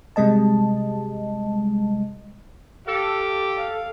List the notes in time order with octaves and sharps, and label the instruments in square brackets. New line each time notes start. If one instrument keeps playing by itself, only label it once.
[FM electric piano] C3 G3 G#3 D#5 A5
[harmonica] G4 [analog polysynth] A4 [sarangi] F5
[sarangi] F5